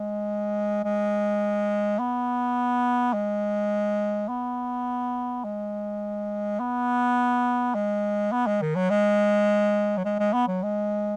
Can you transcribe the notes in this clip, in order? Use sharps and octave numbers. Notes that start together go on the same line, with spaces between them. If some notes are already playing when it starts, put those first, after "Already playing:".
Already playing: G#3
G#3
B3
G#3
B3
G#3
B3
G#3
B3
G#3
D#3
F#3
G#3
F#3
G#3
G#3
B3
F#3
G#3